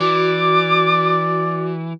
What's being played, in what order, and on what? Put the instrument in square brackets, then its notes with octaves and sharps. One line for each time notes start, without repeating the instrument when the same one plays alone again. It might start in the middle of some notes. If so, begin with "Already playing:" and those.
[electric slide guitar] E3 [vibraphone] F#4 [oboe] D5 [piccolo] D6